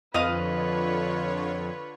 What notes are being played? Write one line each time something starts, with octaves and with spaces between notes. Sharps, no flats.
F2 D3 F4 B4 C#5 D#5 F5 D#6